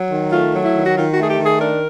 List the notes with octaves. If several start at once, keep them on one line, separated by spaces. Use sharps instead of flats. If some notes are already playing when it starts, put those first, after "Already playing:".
Already playing: F#3
D#3
A3 F4
F#3
E4
D#3
F#4
D#3 F4
F#4
A3 G#4
G4
D#3
G#4
D4 A#4